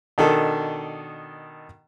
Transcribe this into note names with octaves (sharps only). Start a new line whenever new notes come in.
B2 D#3 D4 A4